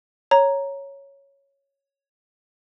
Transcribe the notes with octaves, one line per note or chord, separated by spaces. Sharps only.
C#5 A#5